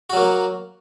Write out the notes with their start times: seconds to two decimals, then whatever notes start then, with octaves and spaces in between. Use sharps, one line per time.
0.10 F#4
0.13 F#3
0.17 A#3